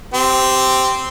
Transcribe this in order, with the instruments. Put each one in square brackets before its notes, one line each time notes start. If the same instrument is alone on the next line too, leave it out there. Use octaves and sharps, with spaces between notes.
[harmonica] C4 G4